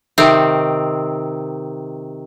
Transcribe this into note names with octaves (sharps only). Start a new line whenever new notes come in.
C3 D#3 C4